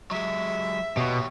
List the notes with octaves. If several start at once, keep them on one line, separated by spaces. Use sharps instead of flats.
F#3 G#3 E5
B2 G4 C#5